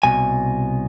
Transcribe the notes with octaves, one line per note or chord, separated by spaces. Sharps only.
C2 B2 G#5